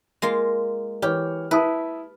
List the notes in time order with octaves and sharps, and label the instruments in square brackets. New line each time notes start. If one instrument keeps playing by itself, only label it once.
[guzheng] G#3 A#3 F4
[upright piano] E3 C#5 F6 [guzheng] G4
[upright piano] E4 A5 D#6 [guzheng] B4